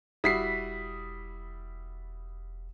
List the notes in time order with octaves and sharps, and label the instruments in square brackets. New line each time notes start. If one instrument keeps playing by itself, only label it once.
[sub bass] E1 [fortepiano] G3 E4 F#4 [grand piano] D#6 B6 C7